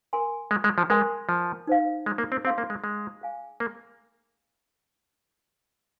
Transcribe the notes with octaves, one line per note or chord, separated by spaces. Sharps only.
A#4 G#5 C6
G#3
G#3
F3
G#3 A#4 G#5 C6
F3
D#4 C5 F5
G#3
A#3
C4
C4 G#4 F5 C6
A#3
G#3
G#3
G#4 F5 G#5
A#3